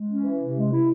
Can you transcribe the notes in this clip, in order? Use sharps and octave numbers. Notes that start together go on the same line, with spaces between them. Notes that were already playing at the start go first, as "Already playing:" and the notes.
Already playing: G#3
C#4
E3
C3
G#3
E4